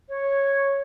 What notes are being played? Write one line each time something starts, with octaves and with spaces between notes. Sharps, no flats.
C#5